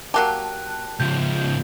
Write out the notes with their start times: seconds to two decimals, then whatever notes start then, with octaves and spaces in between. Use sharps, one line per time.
0.14 F#3 A#3 G4 A5 F#6
1.00 C#2 F3 G6